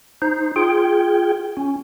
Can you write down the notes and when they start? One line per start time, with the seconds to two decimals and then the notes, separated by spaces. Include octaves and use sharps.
0.22 D#4 C5
0.56 F4 G#4 G5
1.57 C#4